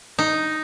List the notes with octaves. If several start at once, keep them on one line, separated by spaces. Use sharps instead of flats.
D#4